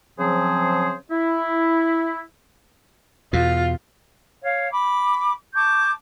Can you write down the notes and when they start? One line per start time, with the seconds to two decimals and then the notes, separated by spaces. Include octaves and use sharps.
0.19 C#3 F3 F#3 C4 G#4 C5
1.10 E4
3.33 E2 B2 F4
4.42 C#5 F5
4.70 B5 D6
5.54 A5 C#6 D6 G6